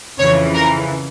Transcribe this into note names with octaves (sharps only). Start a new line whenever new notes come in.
F2 C#3 E3 C#5
A#4